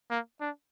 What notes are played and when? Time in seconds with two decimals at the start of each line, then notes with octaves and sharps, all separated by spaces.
0.10 A#3
0.40 D4